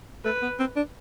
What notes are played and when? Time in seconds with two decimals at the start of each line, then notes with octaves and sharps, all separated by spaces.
0.25 A3 B4
0.42 B3
0.59 C4
0.76 D4